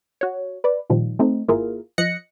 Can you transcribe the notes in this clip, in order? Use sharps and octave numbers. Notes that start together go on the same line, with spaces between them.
F#4 C#5
B4 D5
A#2 D#3 F3 G3
A3 C4 D#4
G#1 A#3 E4 F4 G#4 A#4
F3 D#5 F#6 A#6 C#7